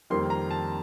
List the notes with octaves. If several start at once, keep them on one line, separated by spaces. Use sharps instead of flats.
F2 D#3 G3 A#3 C6
A#5
A5